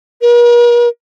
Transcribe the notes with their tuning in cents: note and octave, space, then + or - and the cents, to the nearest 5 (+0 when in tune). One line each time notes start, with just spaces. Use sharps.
A#4 +45